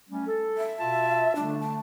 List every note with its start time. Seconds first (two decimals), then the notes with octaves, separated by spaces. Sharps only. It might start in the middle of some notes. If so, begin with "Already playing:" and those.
0.09 G3 A3 C#4
0.27 A4
0.57 E5
0.79 B2 F4 A5
1.36 D3 G3 A3 D4
1.61 A5